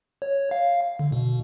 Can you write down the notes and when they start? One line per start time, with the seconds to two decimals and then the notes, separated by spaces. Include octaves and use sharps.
0.22 C#5
0.51 F5
0.99 D3
1.12 B2